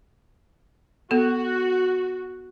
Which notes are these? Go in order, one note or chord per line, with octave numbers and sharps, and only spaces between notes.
B3 F#4 A4